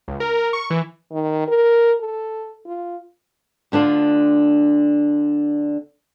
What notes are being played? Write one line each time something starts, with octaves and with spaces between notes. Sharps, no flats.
C#2
A#4
A#4
C#6
E3
D#3
A#4
A4
F4
D2 D3 D4 F4